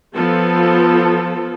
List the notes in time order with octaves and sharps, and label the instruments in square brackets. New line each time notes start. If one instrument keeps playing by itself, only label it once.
[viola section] F3 B3 A4